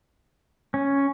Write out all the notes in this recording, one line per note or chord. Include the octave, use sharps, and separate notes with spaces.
C#4